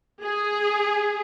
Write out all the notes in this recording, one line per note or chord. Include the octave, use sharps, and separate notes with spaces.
G#4